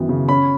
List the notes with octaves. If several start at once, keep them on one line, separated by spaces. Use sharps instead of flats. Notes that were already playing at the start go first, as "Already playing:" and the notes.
Already playing: F#2 D#3 E3 B3
C#3
C#4 B5